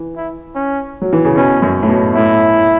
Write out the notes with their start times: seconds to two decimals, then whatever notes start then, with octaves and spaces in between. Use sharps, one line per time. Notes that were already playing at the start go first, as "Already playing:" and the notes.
Already playing: E3
0.16 E4
0.55 C#4
1.02 F#3
1.13 E3
1.25 C#3
1.36 B2 C#4
1.62 F#2
1.83 A2
1.89 B2
2.15 A2 E4